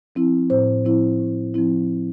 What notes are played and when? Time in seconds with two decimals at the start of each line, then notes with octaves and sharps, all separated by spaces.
0.15 F3 C4 E4
0.50 A2 C5
0.85 F3 C4 E4
1.20 A2
1.54 F3 C4 E4